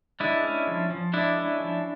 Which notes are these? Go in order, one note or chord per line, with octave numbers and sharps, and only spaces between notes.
G#3 D4 E4
C#4
F3
F3
G#3 D4 E4
C#4
F3